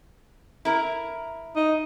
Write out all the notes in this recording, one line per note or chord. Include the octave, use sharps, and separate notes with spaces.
E4 A#4
D#4